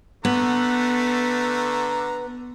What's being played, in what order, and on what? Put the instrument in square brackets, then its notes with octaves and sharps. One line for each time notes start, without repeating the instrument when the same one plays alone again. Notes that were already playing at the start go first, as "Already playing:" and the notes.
[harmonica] D3 A3 A#5 [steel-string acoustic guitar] B3